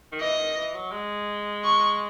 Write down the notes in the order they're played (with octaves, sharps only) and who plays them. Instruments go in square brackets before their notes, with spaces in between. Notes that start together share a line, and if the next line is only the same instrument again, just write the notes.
[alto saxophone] D#3
[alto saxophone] E3 [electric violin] D#5
[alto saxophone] D#3
E3
F#3
G#3
[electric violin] C#6